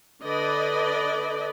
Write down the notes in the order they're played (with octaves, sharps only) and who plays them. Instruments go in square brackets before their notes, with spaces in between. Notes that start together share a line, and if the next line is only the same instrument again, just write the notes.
[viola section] D3 B4 D5 D#5